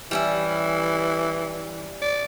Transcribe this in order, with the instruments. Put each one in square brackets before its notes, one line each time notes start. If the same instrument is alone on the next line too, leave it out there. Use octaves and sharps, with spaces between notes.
[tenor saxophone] E3 [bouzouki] G3 C#4 E4
[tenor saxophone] D5